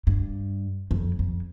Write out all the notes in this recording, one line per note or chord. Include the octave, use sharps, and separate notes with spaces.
G2
F2
F2